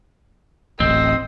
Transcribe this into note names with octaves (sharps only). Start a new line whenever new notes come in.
D1 A1 C4 D#5